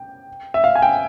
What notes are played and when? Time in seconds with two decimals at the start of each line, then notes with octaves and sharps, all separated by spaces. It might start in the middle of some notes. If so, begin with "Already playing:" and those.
Already playing: G5
0.54 E5
0.64 F5
0.75 G#5
0.82 G5